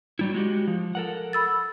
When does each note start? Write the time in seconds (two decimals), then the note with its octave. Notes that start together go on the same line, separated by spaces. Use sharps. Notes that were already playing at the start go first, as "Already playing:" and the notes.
0.19 F#3 G3 E4
0.34 G#3 F#4 G4
0.67 F3
0.95 A4 A#4 F#5
1.33 B5 E6 A6